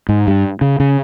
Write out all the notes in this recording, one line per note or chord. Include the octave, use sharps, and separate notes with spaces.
G#2
G2
C#3
C#3